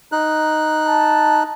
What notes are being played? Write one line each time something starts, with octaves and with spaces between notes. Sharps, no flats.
D#4 F#6
A5